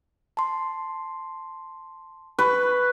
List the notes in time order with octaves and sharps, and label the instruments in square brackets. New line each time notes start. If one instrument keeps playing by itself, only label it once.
[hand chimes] A5 C6
[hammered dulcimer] B4 [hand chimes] C#6